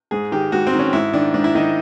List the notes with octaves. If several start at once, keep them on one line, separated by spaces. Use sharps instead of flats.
G#2 G#4
D#3 G4
G#2 F#4
C4
D#3
C#4
G#2 E4
D#3 D4
G#2 D4
E4
D#3 D#4